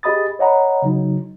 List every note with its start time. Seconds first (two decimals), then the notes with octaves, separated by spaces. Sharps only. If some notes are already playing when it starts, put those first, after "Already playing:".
0.03 G4 G#4 D#5 B5 D#6 A6
0.39 C#5 D#5 F#5 A#5 B5
0.82 C#3 F#3 D#4